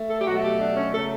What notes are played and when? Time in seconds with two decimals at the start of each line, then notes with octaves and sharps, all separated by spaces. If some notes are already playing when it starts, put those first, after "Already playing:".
Already playing: A3
0.09 A4
0.21 G4
0.26 B2 F#3 A3 F#4
0.44 G4
0.60 D4
0.77 C#4
0.93 C#3 F#3 A3 A4